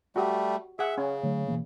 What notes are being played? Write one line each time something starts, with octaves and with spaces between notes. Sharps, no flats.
G3 A3 F#4 G4
G#4 E5 F#5
C#3 C#4
D3 F#3 A3
B2 E3 A#3